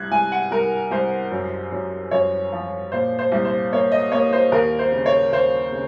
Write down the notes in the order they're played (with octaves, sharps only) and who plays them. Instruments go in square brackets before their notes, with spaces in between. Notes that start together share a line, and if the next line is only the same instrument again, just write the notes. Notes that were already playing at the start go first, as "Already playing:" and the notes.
Already playing: [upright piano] C2 F#6 G#6
C2 G#5
F#5
C2 A#4
C2 C5
F#2
F#2
F#2 C#5
F3
A#2 C5
C5
C2
C5
A#3 C#5
D#5
A#3 C#5
C5
D#2 A#4
C5
C#3
C#5
D#2 C5
C#3